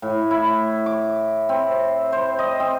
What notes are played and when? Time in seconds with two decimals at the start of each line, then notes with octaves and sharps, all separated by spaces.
0.02 A2
0.31 E4
0.86 D6
1.49 C4
2.12 C5
2.39 D#5
2.60 C4